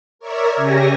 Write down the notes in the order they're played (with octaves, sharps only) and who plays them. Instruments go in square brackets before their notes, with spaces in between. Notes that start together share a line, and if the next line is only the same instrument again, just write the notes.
[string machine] A#4 C#5 D5 E5
C#3 G4 G#5 A#6